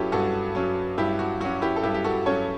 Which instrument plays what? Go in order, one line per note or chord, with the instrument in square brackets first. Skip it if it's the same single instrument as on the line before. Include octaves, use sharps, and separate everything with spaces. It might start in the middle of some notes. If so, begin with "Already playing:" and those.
Already playing: [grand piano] G2 F#3 C#4 E4 F#4 G4 A4
G2 F#4 A4
F#3 C#4
G2 E4 G4
F#4
F#3 C#4 F#4
E4 G4
A4
G2 E4 G4
G4
F#4 A4
F#3 C#4 A4 C#5